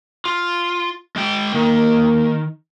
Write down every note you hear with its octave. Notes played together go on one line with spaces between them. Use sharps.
F4
G#3 G5
D#3 A#3